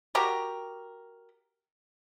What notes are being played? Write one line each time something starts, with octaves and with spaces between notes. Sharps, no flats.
F#4 G4 A#4